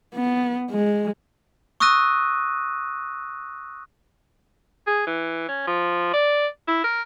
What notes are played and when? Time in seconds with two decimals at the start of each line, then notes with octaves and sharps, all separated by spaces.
0.15 B3
0.71 G#3
1.80 C#6 D#6 E6 F#6 A#6 D#7
4.87 G#4
5.07 E3
5.48 C#4
5.67 F3
6.13 D5
6.68 E4
6.84 A#4